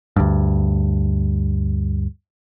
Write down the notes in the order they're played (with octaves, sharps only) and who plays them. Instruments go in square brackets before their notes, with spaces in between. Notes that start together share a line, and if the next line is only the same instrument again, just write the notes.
[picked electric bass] D2 G2